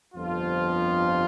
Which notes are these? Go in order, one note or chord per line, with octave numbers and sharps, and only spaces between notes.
G1 F2 F3 F4